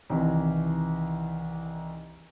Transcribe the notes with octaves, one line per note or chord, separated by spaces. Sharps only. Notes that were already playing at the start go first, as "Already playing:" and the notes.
C2 D#3 E3